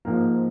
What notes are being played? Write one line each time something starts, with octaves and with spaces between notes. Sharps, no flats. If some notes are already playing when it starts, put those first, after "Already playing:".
G#2 F3 A#3